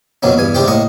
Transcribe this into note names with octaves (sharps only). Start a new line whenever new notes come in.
F2 B2 F#3 A#3 C4 C#4
E2 G2 G#5
G#2 C3 G3 G4 C5 G5
A2 A#3 D#5 C#6